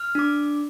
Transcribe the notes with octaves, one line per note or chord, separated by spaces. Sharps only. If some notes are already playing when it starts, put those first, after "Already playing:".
Already playing: F6
D4 D6